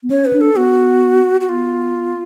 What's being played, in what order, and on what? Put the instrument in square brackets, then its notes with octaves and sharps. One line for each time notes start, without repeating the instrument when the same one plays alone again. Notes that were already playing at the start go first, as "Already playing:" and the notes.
[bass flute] B3
[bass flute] C#4 [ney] C#5
[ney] B4
[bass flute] D4
[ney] A4
[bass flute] B3 [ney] F#4
[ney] F#4
[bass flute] B3 [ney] F4